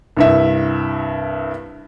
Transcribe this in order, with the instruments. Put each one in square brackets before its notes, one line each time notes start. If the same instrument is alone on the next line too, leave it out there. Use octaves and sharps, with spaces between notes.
[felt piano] C2 G2 E5